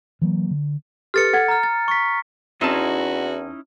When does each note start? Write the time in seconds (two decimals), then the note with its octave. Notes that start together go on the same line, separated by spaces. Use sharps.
0.22 E3 F#3 A#3
0.51 D3
1.14 G4 A4 B4 F6 A6 C#7
1.33 A4 F#5 G#6
1.48 A#5 F6
1.63 A6
1.88 C#6 B6
2.61 E2 C4 C#4 D#4 E4 F#4 A5